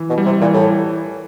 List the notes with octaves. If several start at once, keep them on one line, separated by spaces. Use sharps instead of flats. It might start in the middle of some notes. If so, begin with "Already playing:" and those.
Already playing: E3
B2
G3
C3
A#2 E3
A2